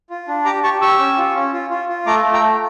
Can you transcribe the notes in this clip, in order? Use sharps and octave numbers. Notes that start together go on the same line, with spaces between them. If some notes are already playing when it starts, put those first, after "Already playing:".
F4
D4
G4 A#5 D6
G4 A5 C#6
G4 C#6 E6
C#4
F4
C#4
F4
F4
F4
A3 A#5 D6
A3
G5 A#5
A3